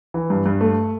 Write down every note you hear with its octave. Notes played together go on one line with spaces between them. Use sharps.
E3
G2
G2
A3